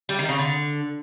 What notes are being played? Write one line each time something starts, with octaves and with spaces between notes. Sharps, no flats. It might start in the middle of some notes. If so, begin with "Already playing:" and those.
G3
D#3
C#3
D3